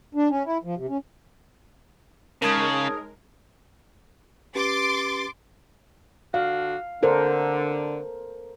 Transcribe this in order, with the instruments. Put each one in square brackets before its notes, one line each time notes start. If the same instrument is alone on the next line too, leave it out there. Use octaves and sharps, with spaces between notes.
[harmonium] D4
C#4
E4
F3
C3
C#4
[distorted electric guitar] C#3 [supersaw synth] G#3 A#4 [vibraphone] D#4 D#6 [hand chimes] C#5 A5 G#6
[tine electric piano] C#4 G4 B4 [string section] C6 D6 A6
[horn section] D3 D4 F#4 [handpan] F5
[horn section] D3 [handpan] A4 A#4 C5